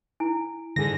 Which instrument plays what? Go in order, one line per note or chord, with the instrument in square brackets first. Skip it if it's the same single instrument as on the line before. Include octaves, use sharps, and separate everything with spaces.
[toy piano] E4 G#5
[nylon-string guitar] G#2 G#4 [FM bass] D3 [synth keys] A#6